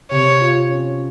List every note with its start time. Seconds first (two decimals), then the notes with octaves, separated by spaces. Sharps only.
0.11 C3 C#5
0.40 F4
0.69 C#4